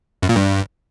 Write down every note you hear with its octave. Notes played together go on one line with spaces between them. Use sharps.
F#2
A#2
G2